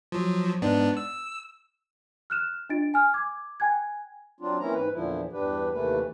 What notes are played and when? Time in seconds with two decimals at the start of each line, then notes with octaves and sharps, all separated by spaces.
0.12 F3 F#3
0.62 G#2 B3 D4
0.97 E6
2.30 F6 F#6 E7
2.69 D4 F4 D#5 A6 D7
2.94 G#5 F6
3.14 D6 G#6
3.60 G5 G#5 F#6 G#6
4.41 F#3 C4 D4 F4
4.60 E3 A#3 C4 C#4 E4 A#5
4.74 G#2 B4
4.92 E2 A#2 D3 F3 E4
5.32 E2 G2 D4 G4 B4
5.73 D#2 C3 E3 A3 A#3 B4